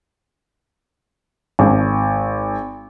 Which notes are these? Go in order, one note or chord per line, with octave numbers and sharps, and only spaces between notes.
G#1